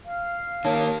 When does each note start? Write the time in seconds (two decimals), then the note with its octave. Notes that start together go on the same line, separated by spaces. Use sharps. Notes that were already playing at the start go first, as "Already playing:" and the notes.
0.06 F5
0.65 D#3 A#3 C#5 A5